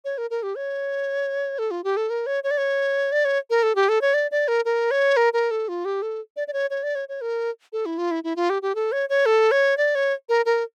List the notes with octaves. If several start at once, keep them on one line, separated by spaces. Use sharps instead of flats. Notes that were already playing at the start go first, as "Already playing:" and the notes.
C#5
A#4
A#4
G4
C#5
A4
F4
G4
A4
A#4
C#5
C#5
D5
C#5
D5
C#5
A#4
A4
G4
A4
C#5
D5
D5
A#4
A#4
C#5
A#4
A#4
A4
F4
G4
A4
D5
D5
C#5
C#5
D5
C#5
C#5
A#4
A4
E4
F4
E4
E4
F4
G4
G4
A4
C#5
C#5
A4
C#5
D5
C#5
A#4
A#4